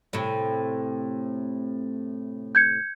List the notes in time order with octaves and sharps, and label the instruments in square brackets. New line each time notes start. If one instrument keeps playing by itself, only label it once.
[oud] A2 C3
[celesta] G6 G#6 C#7